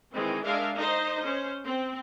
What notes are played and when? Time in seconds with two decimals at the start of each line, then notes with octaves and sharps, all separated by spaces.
0.12 D#3 E3 G#3 C4
0.45 G#3 D4 A#4 E5 F5
0.77 D#4 C5 D#5
1.24 C#4 C5
1.66 C4